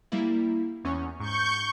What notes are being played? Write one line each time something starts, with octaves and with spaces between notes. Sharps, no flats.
G3 A#3 E4
E2 C#4 C#6
G#2 C#6 G6